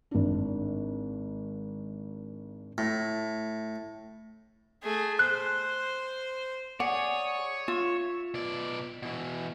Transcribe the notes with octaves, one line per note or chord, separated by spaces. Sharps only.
G#1 D4
A2
A3 G#4
C5 F#6
G#4 C#5 D5 F#5
F4 E5
B2 D5
B2 E3